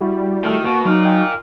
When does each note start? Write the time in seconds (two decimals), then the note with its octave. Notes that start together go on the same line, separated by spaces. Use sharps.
0.01 G3 E4 F#4 G4
0.44 D#3 A3
0.64 B2 A#3 F#4
0.85 F#3 D#4 F4 A#4
1.05 D#5 G5 G#5